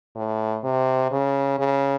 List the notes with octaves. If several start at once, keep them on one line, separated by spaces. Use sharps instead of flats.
A2
C3
C#3
C#3